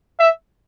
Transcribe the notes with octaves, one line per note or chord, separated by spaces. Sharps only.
E5